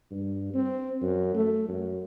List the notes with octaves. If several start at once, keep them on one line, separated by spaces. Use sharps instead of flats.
G2
C4
F#2
A3
F#2